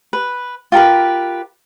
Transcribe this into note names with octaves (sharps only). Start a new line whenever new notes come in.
B4
F4 G4 A#4 B4